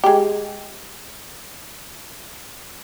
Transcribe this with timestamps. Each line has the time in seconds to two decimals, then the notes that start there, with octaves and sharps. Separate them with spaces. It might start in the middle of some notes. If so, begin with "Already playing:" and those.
0.04 G#3 G4